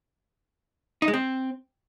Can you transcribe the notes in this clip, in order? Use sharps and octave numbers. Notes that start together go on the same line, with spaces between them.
D#4
G#3
C4